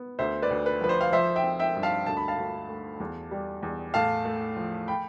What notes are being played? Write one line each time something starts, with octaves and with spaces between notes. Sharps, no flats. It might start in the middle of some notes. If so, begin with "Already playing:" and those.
Already playing: B3
D2 C5 E5
B4 D5
D2
B4
F3 B4
C5
F5
F3 C5 E5
E5 G5
C4
E5 G5
G2
F5 A5
D2 A5
B5
F5 A5
D2
A3
E2
G3
E2
A2 F5 A5
A3
F3
G5 B5